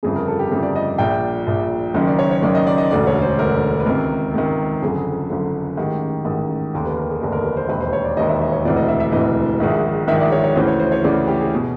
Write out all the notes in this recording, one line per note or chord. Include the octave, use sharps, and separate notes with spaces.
G1 F2 C#3 G#4
A#4
A4
G4
G1 F2 C#3
D5
D#5
A#1 A#2 G5
A#1 A#2
F#1 F#2 D#3
D5
C#5
C#5
F#1 F#2 D#3 D5
D#5
D5
D#5
E1 D2 D3 D5
C#5
C5
E1 D2 D3 A#4
B4
C#2 C3 D#3 A#4
C#2 C3 D#3
F#1 F2 D3 G#4
F#1 F2 D3
A1 G#2 D#3 G4
A1 G#2 D#3
F1 D#2 D3 G4
B4
A#4
G#4
F1 D#2 D3
A#4
B4
C5
E1 D#2 D#3 B4
C5
C#5
D5
E1 D#2 D#3 D#5
E5
E5
C#5
E1 D2 C3 E3 D5
D#5
E5
E5
E1 D2 C3 E3 D#5
A#1 G#2 D#3
A#1 G#2 D#3 E5
D5
C#5
C#5
D2 C#3 E3 C5
C#5
C5
C#5
D2 C#3 E3 D5
G4
G#4
B2